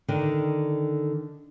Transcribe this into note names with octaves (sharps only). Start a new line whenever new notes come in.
D3 D#3 D4